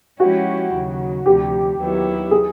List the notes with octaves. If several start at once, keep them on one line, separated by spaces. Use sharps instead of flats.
F3 G#3 C#4 E4 F#4 G4
D#2 C#3 F#3
D2 C3 F3 G4
D#2 D#3 F#3 B3 E4
G#4